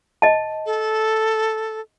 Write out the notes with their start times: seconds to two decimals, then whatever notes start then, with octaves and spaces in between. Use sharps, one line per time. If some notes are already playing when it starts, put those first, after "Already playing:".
0.22 D#5 A5
0.66 A4